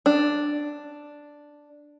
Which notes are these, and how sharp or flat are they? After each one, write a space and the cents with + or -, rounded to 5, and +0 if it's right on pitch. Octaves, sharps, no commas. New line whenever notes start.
D4 +0